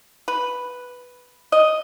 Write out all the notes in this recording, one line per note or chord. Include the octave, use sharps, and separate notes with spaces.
B4
D#5